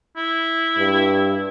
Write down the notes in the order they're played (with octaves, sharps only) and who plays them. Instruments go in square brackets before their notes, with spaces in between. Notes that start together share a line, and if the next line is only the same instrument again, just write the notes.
[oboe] E4
[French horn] G2